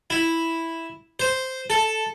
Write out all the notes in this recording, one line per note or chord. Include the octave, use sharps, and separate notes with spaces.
E4
C5
A4